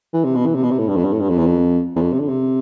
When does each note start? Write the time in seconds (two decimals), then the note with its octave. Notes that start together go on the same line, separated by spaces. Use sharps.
0.13 E3
0.24 C3
0.35 B2
0.46 E3
0.55 C3
0.63 B2
0.70 C3
0.79 A2
0.88 G2
0.96 F2
1.04 G2
1.12 A2
1.20 G2
1.29 F2
1.37 E2
1.46 F2
1.96 E2
2.01 F2
2.12 C3
2.19 D3
2.28 C3